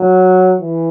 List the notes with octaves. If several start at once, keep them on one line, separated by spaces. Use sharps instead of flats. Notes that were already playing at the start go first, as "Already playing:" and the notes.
Already playing: F#3
E3